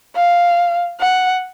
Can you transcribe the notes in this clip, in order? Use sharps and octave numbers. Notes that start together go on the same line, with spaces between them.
F5
F#5